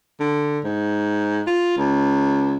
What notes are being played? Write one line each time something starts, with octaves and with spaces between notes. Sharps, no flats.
D3
G#2
F4
C#2